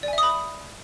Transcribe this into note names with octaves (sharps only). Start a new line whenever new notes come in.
D5 E5 G#5 B5 D#6